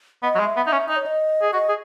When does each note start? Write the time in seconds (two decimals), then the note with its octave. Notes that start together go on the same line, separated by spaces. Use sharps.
0.23 B3 D#5
0.35 F#3
0.40 G#3
0.44 E5
0.56 B3
0.66 D#4 E5
0.72 C#4
0.88 D#4 D#5
0.96 C#5
1.06 D#5
1.42 G#4
1.53 F#4 D#5
1.69 G#4